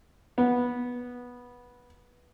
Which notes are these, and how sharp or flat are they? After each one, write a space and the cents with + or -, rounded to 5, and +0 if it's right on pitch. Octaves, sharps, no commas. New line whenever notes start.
B3 -10